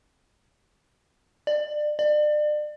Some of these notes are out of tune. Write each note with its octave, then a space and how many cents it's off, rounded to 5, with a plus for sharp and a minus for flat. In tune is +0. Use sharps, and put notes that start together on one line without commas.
D5 +25
D5 +35